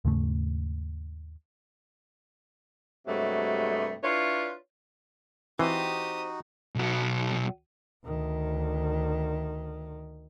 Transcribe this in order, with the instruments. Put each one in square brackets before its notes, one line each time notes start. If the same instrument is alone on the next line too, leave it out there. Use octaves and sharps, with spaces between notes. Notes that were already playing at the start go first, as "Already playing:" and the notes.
[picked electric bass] D#2 G#2 C#3 A3
[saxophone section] G2 C3 F#3 G#3 A3
D4 E4 F4 B4 C#5
[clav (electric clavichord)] E3 [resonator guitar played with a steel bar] C4 [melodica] D#4 F#4 [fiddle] G4 D#6
[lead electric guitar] B1 F#3
[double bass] D2 D#3